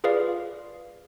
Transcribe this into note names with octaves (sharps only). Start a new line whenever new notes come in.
F4 G#4 B4 D5 F5